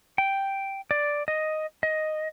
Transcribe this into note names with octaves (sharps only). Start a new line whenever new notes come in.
G5
D5
D#5
D#5